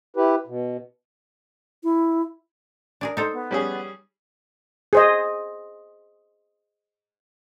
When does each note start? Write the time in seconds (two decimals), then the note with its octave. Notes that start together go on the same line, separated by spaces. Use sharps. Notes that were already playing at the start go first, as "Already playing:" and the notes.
0.16 E4 G4 B4
0.47 B2
1.84 E4
3.01 D4 G#4 A#4
3.17 D#4 A4 C5
3.33 B3
3.51 G3 C#4 G#4
4.93 G#4 C5 D#5